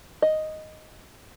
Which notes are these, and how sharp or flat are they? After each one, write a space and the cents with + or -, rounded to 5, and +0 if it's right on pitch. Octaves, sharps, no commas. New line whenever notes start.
D#5 +0